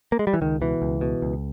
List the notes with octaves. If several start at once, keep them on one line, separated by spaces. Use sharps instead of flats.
A#3
G#3
G3
E3
C#2 D#3
B2 E3
C#2
B2
C#2